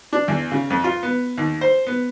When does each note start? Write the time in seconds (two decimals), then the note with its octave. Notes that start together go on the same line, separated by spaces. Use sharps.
0.13 D4
0.28 E2
0.52 C#3
0.70 F2
0.84 F4
1.03 B3
1.38 D#2
1.61 C5
1.87 B3